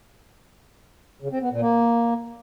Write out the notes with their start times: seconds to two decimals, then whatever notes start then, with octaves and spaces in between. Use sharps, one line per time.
1.22 C#3
1.32 C4
1.42 B3
1.51 A#2
1.61 A#3